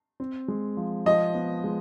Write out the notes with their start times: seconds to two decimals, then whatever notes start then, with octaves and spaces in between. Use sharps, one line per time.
0.20 C4
0.48 G#3
0.77 F3
1.06 F3 D#5
1.35 B3
1.64 G#3